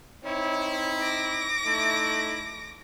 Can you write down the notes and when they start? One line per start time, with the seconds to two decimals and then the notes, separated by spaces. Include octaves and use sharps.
0.24 C4 D#4 E4 C#5
1.00 D6 A#6
1.65 A3 D#4 E4